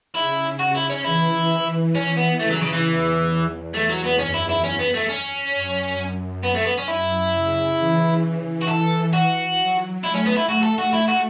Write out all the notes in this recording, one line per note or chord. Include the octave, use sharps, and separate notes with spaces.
C#3 E4
F#4
E4
C#4
E3 E4
E3 C#4
B3
C#3 A3
F#3
C#3
E3
E2
E2 A3
F#3
B3
F#2 C#4
E4
E4
C#4
B3
A3
C#4
F#2
F#2
B3
A3
B3
C#4
F#2 E4
C#3
E3
E3
F#4
A4
F#4
F#3
A3 E4
C#4
B3
E4
F#4
A4
F#4
E4
F#4